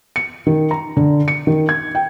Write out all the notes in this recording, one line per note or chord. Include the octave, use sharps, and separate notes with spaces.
C#7
D#3
A#5
D3
C#7
D#3
G#6
G5